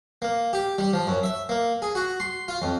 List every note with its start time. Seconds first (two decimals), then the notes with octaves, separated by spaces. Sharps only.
0.22 A#3
0.53 G4
0.78 G3
0.93 F3
1.07 F#2
1.23 E5
1.49 A#3
1.82 G#4
1.95 F#4
2.20 C6
2.48 F4
2.62 F2